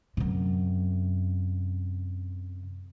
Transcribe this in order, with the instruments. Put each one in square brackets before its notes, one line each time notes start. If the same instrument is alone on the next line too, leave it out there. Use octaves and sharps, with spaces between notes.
[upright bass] F#2 C3